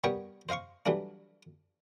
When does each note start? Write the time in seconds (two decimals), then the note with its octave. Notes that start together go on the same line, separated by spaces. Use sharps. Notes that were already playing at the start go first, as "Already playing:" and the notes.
0.04 G3 B3 A#4 C#5 G5
0.49 C5 D#5 F5 C6 C#6
0.86 E3 F#3 G3 A3 D4